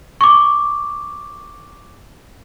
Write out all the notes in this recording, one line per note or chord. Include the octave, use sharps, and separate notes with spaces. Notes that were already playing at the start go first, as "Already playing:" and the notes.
C#6 D6